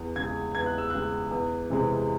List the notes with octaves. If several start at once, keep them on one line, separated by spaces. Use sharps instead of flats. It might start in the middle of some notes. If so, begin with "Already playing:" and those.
Already playing: E2
C#3 G#3 G#6
E2 G#6
F#6
E6
C#3 G#3 F#6
E2
C3 E3 G#3